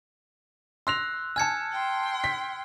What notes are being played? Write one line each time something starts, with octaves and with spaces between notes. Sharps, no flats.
C6 E6 F#6 A#6 F7
G#5 A5 F6 G#6 C#7
G5 C6
B6